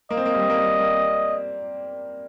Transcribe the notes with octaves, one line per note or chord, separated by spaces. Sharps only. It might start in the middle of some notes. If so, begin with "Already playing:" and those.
A#3 D#5
C4
A#3
G3
C4
A#3
G3
A#3